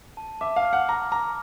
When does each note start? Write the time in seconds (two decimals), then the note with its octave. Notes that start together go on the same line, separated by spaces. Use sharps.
0.17 A5
0.41 E5 D6
0.56 F5
0.65 F6
0.73 F#5
0.89 A#5 D6
1.12 A#5 D6